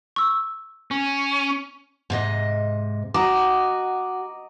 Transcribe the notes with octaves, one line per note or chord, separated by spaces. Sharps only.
C#6 E6
C#4
G#2 C3 D#5
F#4 D#5 A#5 D6